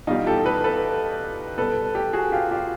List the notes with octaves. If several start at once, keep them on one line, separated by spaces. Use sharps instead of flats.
E2 B2 G3 D#4 F4
G4 A4
A4 B4
A4 B4
B2 G3 A4 B4
G4 A4
F#4 G#4
F4 G4
F4 G4